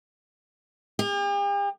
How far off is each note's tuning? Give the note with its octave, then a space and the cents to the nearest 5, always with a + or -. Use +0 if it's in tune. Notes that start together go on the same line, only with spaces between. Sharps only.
G4 +45